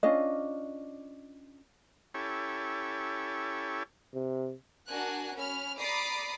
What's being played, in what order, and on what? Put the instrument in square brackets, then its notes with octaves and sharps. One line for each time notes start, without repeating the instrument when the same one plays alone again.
[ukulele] C#4 D4 F4 D#5
[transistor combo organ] C#4 E4 G4 A4 C#5
[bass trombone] C3
[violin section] D4 F#4 A#4 G#5 F#6
C#4 B5 F6
D5 A#5 B5 D6 D#6 C7